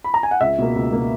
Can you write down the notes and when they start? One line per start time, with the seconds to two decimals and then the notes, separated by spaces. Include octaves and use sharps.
0.04 B5
0.14 A#5
0.23 G#5
0.31 F#5
0.41 C#2 E5
0.58 B2 A#3
0.76 C#2
0.92 B2 A#3